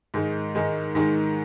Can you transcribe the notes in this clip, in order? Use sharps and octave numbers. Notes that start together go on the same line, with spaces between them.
G#2 D#3 G#3
G#2 D#3 G#3
G#2 D#3 G#3